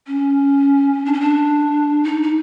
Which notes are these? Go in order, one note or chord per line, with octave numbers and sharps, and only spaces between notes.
C#4
D4
C#4
D4
D#4
D#4